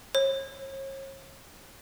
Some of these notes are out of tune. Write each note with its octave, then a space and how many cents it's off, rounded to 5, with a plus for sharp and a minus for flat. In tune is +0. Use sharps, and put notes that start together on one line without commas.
C#5 -40